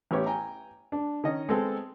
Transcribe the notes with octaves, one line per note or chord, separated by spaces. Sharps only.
A1 B3 G4 C#5
G5 G#5 A#5
D4
D#3 C#4 D#5
G#3 B3 C4 A4